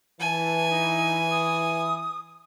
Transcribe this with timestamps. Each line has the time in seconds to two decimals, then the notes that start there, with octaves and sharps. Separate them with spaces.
0.20 E3 G#5 A5
0.70 D#4
1.31 D#6